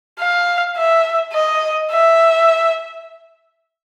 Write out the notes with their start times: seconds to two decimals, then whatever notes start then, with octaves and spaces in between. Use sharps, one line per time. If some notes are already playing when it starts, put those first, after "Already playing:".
0.20 F5
0.77 E5
1.33 D#5
1.91 E5